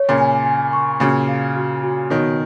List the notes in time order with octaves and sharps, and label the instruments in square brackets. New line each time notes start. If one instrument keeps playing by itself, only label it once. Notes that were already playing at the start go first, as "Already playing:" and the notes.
Already playing: [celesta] C#5
[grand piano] A#2 C#3
[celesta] G#5
G#5
C#6
[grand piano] A#2 C#3 [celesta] F#4
[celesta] F5
F#4
F#4
[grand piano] B2 D#3 [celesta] C#5